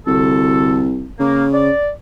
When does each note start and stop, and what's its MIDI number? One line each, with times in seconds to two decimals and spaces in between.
0.07 1.07 36
0.07 0.86 50
0.07 0.86 66
0.07 0.86 69
1.19 1.71 49
1.19 1.45 58
1.54 1.89 74